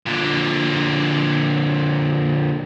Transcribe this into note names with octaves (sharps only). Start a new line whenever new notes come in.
A#2 D3